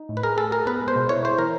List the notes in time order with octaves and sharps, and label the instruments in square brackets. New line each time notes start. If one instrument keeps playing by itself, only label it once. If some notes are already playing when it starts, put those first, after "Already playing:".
Already playing: [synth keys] D#4
A2
[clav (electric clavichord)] B4
[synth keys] G#4 [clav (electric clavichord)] A#4
[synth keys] G#4 [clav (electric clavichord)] A4
[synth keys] G#4 [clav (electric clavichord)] A#4
[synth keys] B3 [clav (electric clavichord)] B4
[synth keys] G#3
[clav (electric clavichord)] C5
[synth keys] B2
[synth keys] E4 [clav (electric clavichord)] C#5
[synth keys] E4 [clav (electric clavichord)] C5
[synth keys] E3 [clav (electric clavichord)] A#4